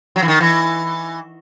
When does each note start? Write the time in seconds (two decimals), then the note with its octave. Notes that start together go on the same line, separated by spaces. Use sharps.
0.16 F#3
0.22 E3
0.28 D#3
0.40 E3